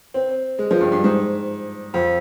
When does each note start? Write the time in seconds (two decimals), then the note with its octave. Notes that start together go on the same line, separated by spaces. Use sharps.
0.14 C4
0.59 G#3
0.71 F3
0.81 G2
0.92 G2
1.04 G#2
1.94 F2